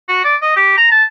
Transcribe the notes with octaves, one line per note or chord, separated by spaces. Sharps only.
F#4
D5
D#5
G4
A#5
A5